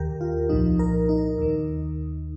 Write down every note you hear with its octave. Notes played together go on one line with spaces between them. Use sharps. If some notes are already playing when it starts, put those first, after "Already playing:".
Already playing: D#2 D#3 G4 A#4
F4
C2 A#2 F3 D#4
A#4
D#4
D#2 D#3